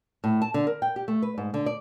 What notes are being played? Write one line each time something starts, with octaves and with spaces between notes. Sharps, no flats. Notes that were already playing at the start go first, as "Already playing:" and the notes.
A2
A5
D3
A#4
G5
G4
A3
B4
G#2
D3
D5